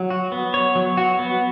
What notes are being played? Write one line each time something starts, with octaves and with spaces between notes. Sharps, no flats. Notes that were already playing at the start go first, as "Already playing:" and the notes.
Already playing: F#3
F#4
B3
C#5
F#3
F#4
B3